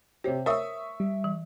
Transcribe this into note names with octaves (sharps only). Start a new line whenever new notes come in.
C3 G4 C5 C#5
A#4 C#5 E5 C#6 D#6 E6
G3
E3